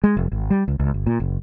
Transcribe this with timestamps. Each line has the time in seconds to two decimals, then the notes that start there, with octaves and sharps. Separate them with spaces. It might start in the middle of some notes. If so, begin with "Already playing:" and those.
0.04 G#3
0.17 F1
0.32 G#1
0.50 G3
0.68 C#2
0.79 C#2
0.94 G1
1.06 A#2
1.20 F#1